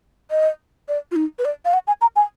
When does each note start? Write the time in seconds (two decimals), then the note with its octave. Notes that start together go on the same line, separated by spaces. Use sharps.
0.31 D#5
0.88 D5
1.11 F4
1.16 D#4
1.39 B4
1.45 D5
1.65 F5
1.73 F#5
1.87 G#5
2.01 A#5
2.16 G#5